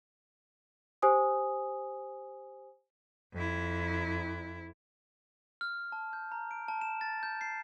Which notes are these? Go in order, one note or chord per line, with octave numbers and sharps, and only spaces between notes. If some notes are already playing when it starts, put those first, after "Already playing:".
G4 C5 G#5 D#6
F2 E4
F6
A5
G6
A#5
D7
A5
E7
A6
G6
C7